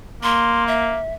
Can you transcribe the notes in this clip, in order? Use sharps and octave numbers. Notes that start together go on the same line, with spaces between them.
A#3 C6
E5